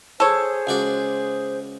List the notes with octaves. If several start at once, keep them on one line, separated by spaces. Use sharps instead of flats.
G#4 A4 C5 C#5 D6
C#2 F#4 D5